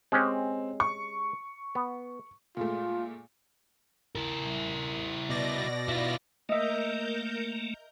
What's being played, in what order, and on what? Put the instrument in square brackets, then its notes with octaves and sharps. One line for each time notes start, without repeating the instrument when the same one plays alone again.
[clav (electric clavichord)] G#3 C#4 G4 [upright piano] C4
[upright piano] C#6
[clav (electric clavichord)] B3
[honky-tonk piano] A#2 G#3 A3 [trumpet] F4
[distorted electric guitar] E4 A#4
[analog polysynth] B2 D5 A#6
[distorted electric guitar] E4 F4
[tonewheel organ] A3 A#3 [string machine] A#4 A#5 G6 [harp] D#5 E5